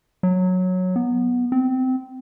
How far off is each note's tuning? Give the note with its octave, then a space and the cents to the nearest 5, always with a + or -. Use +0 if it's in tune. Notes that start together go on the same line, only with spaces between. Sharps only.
F#3 -10
B3 -10
C4 -20